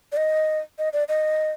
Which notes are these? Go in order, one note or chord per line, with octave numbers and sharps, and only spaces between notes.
D5
D#5
D#5
D5
D#5